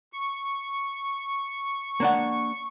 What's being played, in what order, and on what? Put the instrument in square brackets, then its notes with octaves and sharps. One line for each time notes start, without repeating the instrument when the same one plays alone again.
[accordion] C#6
[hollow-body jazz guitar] A#3 D4 F#5